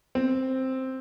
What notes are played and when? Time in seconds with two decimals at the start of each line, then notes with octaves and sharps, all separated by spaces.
0.15 C4